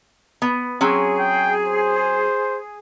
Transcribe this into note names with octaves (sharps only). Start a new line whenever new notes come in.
B3
F#3 C4 C#4 G#4
G5
C5